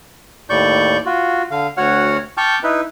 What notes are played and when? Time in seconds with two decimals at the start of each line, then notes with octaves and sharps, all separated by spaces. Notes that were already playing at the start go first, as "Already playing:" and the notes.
0.50 D#2 A2 D5 C#6 G6
1.06 F4 F#4
1.51 D3 F5
1.77 D2 F#4 C#5 F#5 F6
2.37 G5 A5 C#6 D6 F6 G6
2.63 D#4 E4 B4